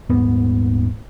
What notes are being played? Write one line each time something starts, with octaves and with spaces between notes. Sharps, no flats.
D#1 G#2 B3